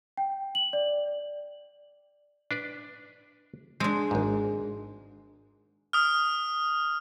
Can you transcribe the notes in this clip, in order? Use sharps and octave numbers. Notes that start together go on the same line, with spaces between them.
G5
F#7
D5
D4 B4 D5
G#3 C4 D4
G#1 G#2
D#6 F6